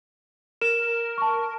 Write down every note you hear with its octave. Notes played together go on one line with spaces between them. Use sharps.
A#4 E7
A5 C#6